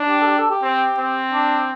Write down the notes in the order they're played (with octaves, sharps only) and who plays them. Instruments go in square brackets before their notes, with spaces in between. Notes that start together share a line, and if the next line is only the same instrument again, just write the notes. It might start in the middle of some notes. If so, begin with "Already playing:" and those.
Already playing: [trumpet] D4
[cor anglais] G4
A4
G4
A4
G4
[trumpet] C4
C4
[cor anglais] D4